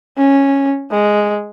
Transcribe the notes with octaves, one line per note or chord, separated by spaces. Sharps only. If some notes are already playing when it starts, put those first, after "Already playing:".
C#4
G#3